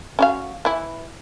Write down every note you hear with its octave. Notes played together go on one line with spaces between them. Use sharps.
C#4 F#4 F5
E3 E4